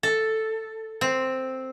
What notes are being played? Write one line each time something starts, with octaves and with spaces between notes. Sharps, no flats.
A4
C4